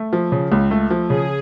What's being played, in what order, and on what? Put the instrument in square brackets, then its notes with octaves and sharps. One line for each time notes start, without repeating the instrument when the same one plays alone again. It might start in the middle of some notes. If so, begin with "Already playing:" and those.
Already playing: [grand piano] A3
F3
C#3
C#2
A3
F3
[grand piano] C#3 [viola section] G#4